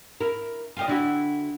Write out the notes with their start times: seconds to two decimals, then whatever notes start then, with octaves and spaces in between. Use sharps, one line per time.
0.21 E4 A#4
0.77 F4 G4 D#5
0.88 D3 E4 F#4